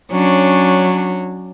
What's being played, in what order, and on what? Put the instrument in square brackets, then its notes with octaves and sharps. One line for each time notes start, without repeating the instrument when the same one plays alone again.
[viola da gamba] F#3 [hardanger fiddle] C#4 D4